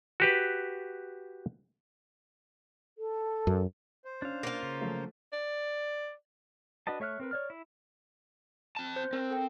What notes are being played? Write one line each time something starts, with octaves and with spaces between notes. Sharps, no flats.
F#4 G4 B4
A4
F#2
C5
C#4 D4 F5
A#3 F4
C#3
F3 F#3 A3
D5
D4 F#4 B4 D#5 A5
A3 C#5 E5 F6 F#6
C4 A#4 B4
C#5 D5 F6
E4
C4 A5
C5 G6
C4 A#4
A4 G5